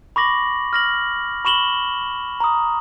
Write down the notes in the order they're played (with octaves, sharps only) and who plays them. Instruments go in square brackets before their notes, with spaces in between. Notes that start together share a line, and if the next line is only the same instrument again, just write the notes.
[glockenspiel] B5 C#6 D6 A#6 F#7
F6 A#6 F#7
B5 C#6 E7 F#7 G7
A#5 D#6